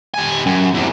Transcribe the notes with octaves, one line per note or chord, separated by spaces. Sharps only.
G3 G#5
F#2
E2 C3